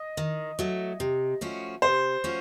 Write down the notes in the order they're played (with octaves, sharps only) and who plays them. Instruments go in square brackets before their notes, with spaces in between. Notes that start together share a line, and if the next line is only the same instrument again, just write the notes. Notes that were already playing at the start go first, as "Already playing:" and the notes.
Already playing: [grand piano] D#5
[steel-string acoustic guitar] D#3
F#3 A3
C3
F3 A3 C#4 F#4
[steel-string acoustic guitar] C3 [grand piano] C5
[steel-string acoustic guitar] F3 A3 C#4 F#4